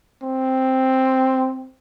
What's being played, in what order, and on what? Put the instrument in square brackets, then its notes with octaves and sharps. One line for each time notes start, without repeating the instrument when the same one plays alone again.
[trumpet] C4